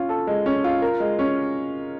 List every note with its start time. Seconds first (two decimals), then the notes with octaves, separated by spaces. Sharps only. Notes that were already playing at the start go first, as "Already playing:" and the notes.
Already playing: C#4 F4
0.09 A4
0.27 G#3
0.46 C#4
0.64 F4
0.82 A#4
1.00 G#3
1.19 C#4